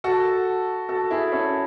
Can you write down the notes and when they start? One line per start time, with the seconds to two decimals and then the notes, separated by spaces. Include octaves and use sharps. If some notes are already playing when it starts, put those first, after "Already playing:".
0.04 F#4 A4
0.89 F#4 A4
1.11 E4 G#4
1.32 C#4 E4